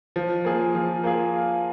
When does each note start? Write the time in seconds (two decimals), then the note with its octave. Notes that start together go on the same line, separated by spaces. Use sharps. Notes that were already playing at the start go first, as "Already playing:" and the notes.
0.16 F3
0.45 A#3 F4 G#4
0.75 F3
1.04 A#3 F4 G#4